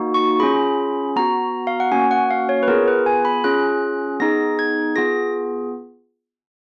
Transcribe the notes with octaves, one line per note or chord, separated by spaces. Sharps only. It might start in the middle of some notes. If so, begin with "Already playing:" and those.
Already playing: A#3 D#4 F#4
C#6
C#4 F4 G#4 B5
B3 F#4 A#5
F5
F#5
A#3 C#4 F#4 G#5
F#5
F5
C#5
B4
B3 F4 G#4 A#4
B4
G#5
B5
C#4 F4 G#4 F#6
B3 D#4 G#4 A#6
G#6
B3 F4 G#4 A#6